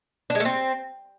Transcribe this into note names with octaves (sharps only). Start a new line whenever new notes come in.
D4
G#3
A3
C4